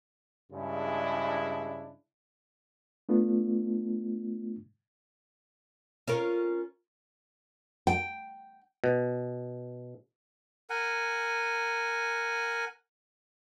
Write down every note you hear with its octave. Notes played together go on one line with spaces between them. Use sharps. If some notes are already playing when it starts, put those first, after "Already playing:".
G2 C#3 G#3 D4 E4
A3 B3 D4 F4
C#4 F4 A#4
G5
B2
A#4 F#5 G#5